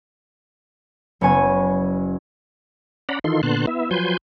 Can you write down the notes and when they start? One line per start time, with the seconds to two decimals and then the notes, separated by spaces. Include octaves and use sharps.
1.21 F#1 B3 C#5 G#5
3.09 C#4 D5 F#5 A#5 B5
3.24 D#3 E3 D#4 F4 A4 C6
3.43 A#2 D3 B3 A5 C6 F#6
3.67 B3 E4 E5
3.91 F3 F#3 B4 G#5 C6 G6